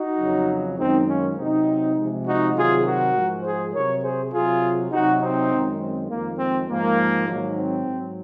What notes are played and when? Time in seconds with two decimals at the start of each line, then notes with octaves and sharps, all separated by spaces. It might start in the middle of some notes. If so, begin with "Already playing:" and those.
Already playing: D#4 F#4
0.19 F2 C#3 F#3
0.78 F#2 D#3 G#3 C4 D#4
1.07 A#3 C#4
1.36 C3 F#3 C4 D#4
1.96 C3 F3 G#3
2.25 D#4 F#4
2.55 C3 D#3 F#3 F4 G#4
2.84 F#4 A#4
3.14 G#2 F3 G#3
3.43 G#4 C5
3.73 C3 F#3 A#4 C#5
4.02 G#4 C5
4.32 C3 F#3 F4 G#4
4.91 C3 F#3 D#4 F#4
5.20 C4 D#4
5.50 F#2 D#3 G#3
5.80 C4
6.09 F2 D#3 G#3 A#3
6.38 C4
6.68 G#2 F3 G#3 A#3
7.28 G#2 D#3 F#3
7.57 C4
7.86 G#2 F#3